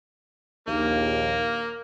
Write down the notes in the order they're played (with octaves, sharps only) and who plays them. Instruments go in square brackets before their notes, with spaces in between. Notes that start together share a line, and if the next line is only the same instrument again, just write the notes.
[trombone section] A#1 D#2 [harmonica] A#3